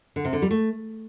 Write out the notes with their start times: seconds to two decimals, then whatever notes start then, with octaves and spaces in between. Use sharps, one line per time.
0.16 D3
0.25 C3
0.33 D3
0.42 G3
0.51 A3